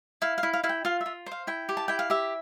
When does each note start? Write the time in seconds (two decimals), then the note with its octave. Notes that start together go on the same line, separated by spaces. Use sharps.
0.22 E4 F5
0.38 F5
0.43 E4
0.53 F5
0.64 E4 F5
0.69 G5
0.85 F4 F5
1.01 E5
1.06 F4
1.26 C5
1.31 F5
1.47 E4 G5
1.69 G4
1.77 A5
1.88 E4 G5
1.99 F5
2.10 G4 E5